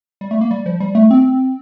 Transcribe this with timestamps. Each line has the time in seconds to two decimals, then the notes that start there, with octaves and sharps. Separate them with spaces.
0.21 G3
0.31 A3
0.41 A#3
0.51 G3
0.66 F3
0.80 G3
0.95 A3
1.11 C4